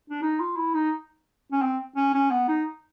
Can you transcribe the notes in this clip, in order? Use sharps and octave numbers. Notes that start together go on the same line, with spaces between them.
D4
D#4
F4
E4
D#4
C#4
C4
C#4
C#4
B3
D#4